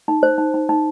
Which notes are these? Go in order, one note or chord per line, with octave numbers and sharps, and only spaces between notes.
D#4
C5
D#4
D#4
D#4